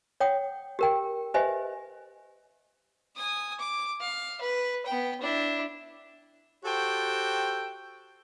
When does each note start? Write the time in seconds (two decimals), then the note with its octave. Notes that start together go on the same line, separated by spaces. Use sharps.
0.20 C#5 F#5 G5 D#6
0.79 G4 A#4 G5
1.34 G4 B4 C5 D#5 E5 G#5
3.16 G#5 D#6
3.59 D6
4.00 F5
4.41 B4
4.86 B3 G5
5.21 D4 E4
6.65 F#4 G4 A4 C5 G5